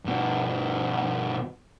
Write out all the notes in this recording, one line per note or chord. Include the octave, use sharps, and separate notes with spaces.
G2 B2